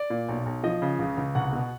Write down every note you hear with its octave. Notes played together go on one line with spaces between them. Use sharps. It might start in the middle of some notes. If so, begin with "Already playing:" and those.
Already playing: D5
A#2
B1
B1
F3 D#5
C#3
C#2
C#2
C2 F#5
B2